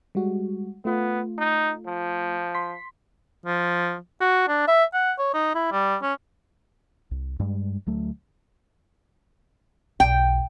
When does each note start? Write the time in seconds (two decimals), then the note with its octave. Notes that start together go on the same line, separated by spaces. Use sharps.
0.15 G3 G#3 F#4
0.85 A3 B3 F4
1.38 D#4
1.86 F3
2.55 C6 B6
3.46 F3
4.21 F#4
4.48 D4
4.67 E5
4.93 F#5
5.18 C#5
5.34 D#4
5.55 E4
5.71 G3
6.02 C#4
7.11 C2
7.40 G2 G3 G#3
7.87 D2 F#3 A3
10.00 B1 E2 G5